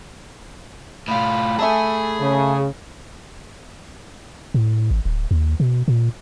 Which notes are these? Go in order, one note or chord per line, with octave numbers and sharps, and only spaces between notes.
A2 F4 B5
A3 G#4 E5 A5
C#3
A2
G#1
D1
D#2
B2
A#2